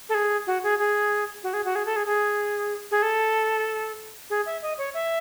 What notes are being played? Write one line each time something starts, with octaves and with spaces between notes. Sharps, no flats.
A4
G#4
F#4
G#4
G#4
F#4
G#4
F#4
G#4
A4
G#4
G#4
G#4
A4
G#4
E5
D#5
C#5
E5